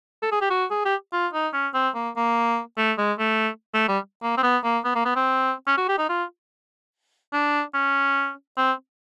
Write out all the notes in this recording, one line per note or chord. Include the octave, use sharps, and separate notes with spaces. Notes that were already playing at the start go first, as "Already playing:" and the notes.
A4
G#4
G4
F#4
G#4
G4
F4
D#4
C#4
C4
A#3
A#3
A3
G#3
A3
A3
G3
A#3
C4
B3
A#3
B3
A#3
B3
C4
C#4
F#4
G4
D#4
F4
D4
C#4
C4